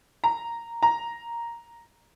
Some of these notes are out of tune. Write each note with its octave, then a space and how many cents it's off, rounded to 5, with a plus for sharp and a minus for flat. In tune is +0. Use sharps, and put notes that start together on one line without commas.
A#5 -5
A#5 +0